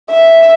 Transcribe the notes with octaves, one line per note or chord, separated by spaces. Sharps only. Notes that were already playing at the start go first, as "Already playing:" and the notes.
E5